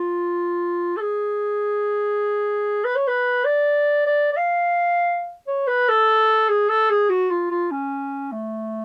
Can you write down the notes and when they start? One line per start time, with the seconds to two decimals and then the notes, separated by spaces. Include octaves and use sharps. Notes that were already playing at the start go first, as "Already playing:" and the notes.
Already playing: F4
0.97 A4
1.01 G#4
2.85 B4
2.96 C#5
3.08 B4
3.45 D5
4.06 D5
4.32 D5
4.37 F5
5.47 C#5
5.68 B4
5.89 A4
6.49 G#4
6.69 A4
6.90 G#4
7.10 F#4
7.30 F4
7.51 F4
7.71 C#4
8.32 A3